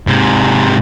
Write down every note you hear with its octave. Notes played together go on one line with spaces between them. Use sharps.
G#2 C3